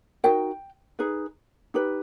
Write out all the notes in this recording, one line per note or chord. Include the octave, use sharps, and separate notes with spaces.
D#4 F#4 A#4 G5
D#4 G#4 B4
D#4 G4 B4